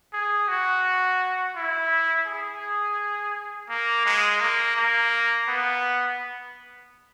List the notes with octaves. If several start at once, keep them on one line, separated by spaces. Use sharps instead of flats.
G#4
F#4
E4
G#4
A#3
G#3
A#3
A#3
B3